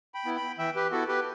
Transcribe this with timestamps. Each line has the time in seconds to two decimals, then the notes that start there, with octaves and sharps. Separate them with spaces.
0.14 G5 B5
0.25 B3 E4
0.36 G5 B5
0.58 E3 E5 G5
0.76 G4 B4
0.91 B3 E4 F#4 A4
1.08 G4 B4